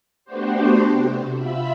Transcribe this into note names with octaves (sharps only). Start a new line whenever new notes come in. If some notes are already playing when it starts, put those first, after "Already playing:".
A3 B3 D4 F#4 G4 C5
C3
F4 E5 B5